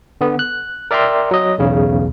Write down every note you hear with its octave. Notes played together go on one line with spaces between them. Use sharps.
D3 B3
F#6
A#4 D5 E5 G5 A#5 C6
F#3 D#5
B1 E2 C#3